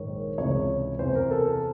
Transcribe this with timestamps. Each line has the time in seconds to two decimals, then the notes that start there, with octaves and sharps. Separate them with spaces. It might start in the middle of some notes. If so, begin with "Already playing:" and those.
Already playing: A#1 G#2 D#3 C#5
0.38 C#2 C3 E3 C#5
0.99 E2 C3 E3 C5
1.15 A#4
1.31 A4